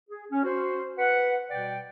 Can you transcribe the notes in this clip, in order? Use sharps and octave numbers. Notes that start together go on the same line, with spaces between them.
G#4
C#4
F#4 C5
B4 F#5
B2 G3 D5 G5